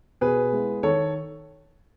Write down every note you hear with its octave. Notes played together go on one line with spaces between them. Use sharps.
B2 G#4 B4
G#3 B3 E4
D#3 A4 C#5